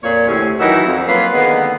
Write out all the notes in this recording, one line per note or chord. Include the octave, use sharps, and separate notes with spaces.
F2 A#2 C#5
D2 A2 C3 C4 C#4
D#3 E3 F#3 D#4 F#4 E5
F2
F#3 A#3 C#4 F4 B4
D3 D#3 G#3 A#3 B3